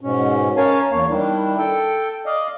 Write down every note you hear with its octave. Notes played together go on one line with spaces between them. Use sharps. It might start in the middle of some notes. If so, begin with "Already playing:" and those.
G#2 B2 C#4
C#4 A#4 C#5 F5 G#5 A5
E2 A#3 C#5 F5
D#3 G3 D4 E4
A4 G5
D5 D#5 F5